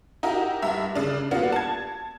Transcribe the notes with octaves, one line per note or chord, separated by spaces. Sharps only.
D#4 E4 F#4 G4 A#4
G2 E5
C#3 D4
G3 A#3 B3 D4 F4 F#4
A5 G#6